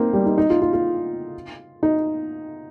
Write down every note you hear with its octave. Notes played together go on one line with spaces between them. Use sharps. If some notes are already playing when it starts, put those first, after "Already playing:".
Already playing: A#3 C4 D#4
G3
D#4
D#4
F4
F4
F4
D#4